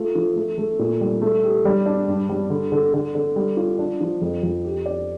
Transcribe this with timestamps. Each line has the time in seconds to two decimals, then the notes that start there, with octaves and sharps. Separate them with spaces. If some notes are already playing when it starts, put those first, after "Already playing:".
Already playing: A3 F4
0.15 F3
0.36 A3
0.58 A3
0.79 A#2
1.01 G3
1.22 A3
1.43 G4
1.65 G3
1.86 D4
2.08 G2
2.29 G3
2.50 D3
2.72 D3
2.93 D3
3.15 D3
3.36 G3
3.57 F4
3.79 D4
4.00 F3
4.22 F2
4.43 F2
4.65 G4
4.86 D5